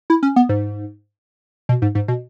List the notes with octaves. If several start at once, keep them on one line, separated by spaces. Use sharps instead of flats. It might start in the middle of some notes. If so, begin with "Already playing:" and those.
E4
C#4
B3
G#2
B2
G#2
G#2
B2